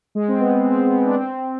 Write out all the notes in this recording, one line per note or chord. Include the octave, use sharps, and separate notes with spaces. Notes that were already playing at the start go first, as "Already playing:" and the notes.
G#3
C4
B3
C4
B3
D4
C4